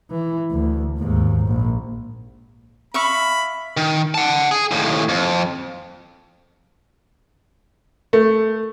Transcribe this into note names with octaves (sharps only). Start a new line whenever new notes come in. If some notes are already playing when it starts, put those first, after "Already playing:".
E3
D2
D#2 G#2
A#1
E5 F5 B5 C#6
D#3
F#5 A5
G#4
D#2 A2
F2
A3